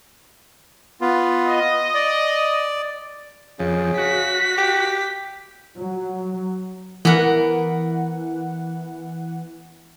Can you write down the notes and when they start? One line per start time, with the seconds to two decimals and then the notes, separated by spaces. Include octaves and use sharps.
1.01 B3 F4
1.47 D#5
1.94 D5
3.59 F2 C#3
3.98 F#4 B6
4.58 G4
5.79 F#3
7.05 E3 B3 A#4 F#5